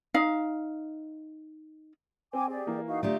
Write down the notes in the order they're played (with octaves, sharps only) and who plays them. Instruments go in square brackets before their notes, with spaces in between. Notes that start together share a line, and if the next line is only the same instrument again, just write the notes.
[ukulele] D#4 F5
[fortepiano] C4 [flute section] G5 G#5 D6
[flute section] G4 G#4 D5
[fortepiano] E3 A#3
[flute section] D#4 F#4 F5
[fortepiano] D3 D#6 [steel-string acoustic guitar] A3 F4 G4 [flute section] D5 E5 A#5